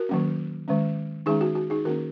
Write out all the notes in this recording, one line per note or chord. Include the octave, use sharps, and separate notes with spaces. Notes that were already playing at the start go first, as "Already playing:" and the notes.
Already playing: F#4 A#4
D#3 F#3 A#3 C#4
D#3 G#3 C#4
D#3 G#3 C#4 D#4 G#4
F#4
F#4
D#4 G#4
D#3 A#3 C#4 F#4 A#4